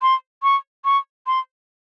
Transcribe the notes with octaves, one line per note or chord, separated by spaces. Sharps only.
C6
C#6
C#6
C6